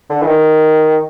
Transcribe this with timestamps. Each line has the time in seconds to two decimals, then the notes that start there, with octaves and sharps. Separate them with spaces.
0.10 D3
0.22 E3
0.26 D#3